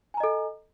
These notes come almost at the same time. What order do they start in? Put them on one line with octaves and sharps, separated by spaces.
G#5 A#5 D#5 A4